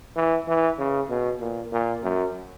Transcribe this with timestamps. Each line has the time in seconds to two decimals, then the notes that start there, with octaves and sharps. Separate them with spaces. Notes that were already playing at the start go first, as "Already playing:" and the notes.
0.16 E3
0.48 E3
0.79 C#3
1.10 B2
1.40 A#2
1.72 A#2
2.04 F#2